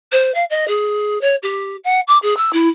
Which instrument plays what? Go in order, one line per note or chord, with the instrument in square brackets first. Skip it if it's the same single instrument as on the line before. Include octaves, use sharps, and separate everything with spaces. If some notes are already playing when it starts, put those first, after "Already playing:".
[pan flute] C5
F5
D#5
G#4
C#5
G4
F#5
D6
G#4
E6
E4